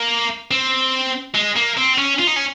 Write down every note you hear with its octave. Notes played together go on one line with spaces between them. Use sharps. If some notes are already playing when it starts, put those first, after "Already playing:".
Already playing: A#3
C4
G#3
A#3
C4
C#4
F4
D#4
C#4